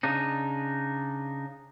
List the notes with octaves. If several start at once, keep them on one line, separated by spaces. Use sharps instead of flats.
C#3 D4 D#4